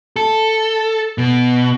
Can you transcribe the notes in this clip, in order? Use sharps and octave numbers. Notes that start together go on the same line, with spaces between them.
A4
B2